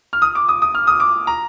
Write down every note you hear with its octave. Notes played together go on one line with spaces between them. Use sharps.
F6
D#6
D6
D#6
D#6
F6
D#6
D6
A#5